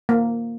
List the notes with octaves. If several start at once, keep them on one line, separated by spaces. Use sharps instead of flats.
A#3